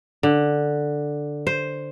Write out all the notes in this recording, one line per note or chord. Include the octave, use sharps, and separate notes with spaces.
D3
C5